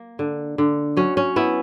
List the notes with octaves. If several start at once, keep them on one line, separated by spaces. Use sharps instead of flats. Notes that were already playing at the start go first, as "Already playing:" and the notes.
Already playing: A#3
D3
D3
F#3 C#4
C#4
B3 E4